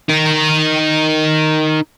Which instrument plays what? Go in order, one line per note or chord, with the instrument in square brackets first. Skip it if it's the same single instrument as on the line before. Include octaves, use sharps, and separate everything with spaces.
[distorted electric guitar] D#4 A#4